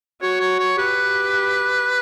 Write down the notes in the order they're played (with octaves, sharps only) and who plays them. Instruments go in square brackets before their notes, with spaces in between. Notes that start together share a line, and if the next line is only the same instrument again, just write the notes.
[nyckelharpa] F#4 [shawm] C#5
[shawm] C#5
C#5
[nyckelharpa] G4 [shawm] B4